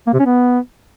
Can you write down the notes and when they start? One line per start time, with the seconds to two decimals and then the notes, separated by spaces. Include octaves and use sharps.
0.07 A#3
0.13 C3
0.19 C#4
0.26 B3